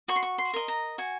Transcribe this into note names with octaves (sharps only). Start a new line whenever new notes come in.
F#4 C#6
C6
C#6
C6
A#4 D#5
A#5
F#4 G#5